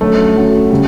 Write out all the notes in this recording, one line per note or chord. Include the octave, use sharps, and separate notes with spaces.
D3 F#3 A3 C#4 F#4
D3 F#3 C#4 F#4
C#3 G3